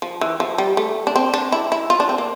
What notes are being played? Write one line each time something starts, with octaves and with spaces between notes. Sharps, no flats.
F3
E3
F3
G3
A3
D4
C4
D4
E4
E4
F4
D4
C4
A#3